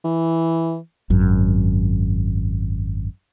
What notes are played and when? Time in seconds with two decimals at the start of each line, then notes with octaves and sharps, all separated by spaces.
0.04 E3
1.10 G#1 F#2